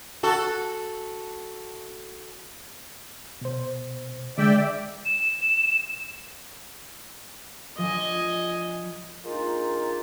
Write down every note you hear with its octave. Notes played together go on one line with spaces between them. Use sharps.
F#4 A4
B2 C5
D3 G#3 D5 E5 G5
E7
F3 D4 D#5 G#5
G#3 A#3 D4 D#4 F4